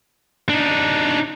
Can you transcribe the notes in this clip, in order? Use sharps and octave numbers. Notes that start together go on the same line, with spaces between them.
D4 D#4